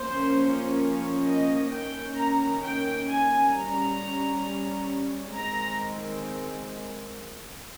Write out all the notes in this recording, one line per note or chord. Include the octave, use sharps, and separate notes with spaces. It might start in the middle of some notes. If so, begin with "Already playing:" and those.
Already playing: F3 A#3 C#4 C5
C#5
D#5
D#3 A#3 C#4 G5
A#5
G5
G#5
G3 C#4 A#5
D#3 G#3 C4 A#5